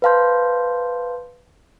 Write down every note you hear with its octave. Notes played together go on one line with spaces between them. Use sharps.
B4 C5 F5 A5 C6 G6